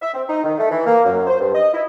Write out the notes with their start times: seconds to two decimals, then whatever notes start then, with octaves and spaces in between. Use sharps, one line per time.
0.02 E5
0.14 C4
0.29 D#4
0.44 D#3
0.58 A3
0.71 E3
0.87 A#3
1.05 F#2
1.27 C5
1.40 G2
1.54 D#5
1.74 E4